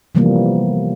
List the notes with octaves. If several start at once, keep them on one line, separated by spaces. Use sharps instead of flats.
C3 E3 F3 G3 A#3 B3